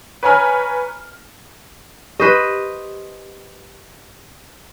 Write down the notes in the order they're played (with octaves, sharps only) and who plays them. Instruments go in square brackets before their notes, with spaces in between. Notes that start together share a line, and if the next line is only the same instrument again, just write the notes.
[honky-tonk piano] B4 C#5 G#5 A#5 B5 F6
[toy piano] G4 [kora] B4 C5 D#5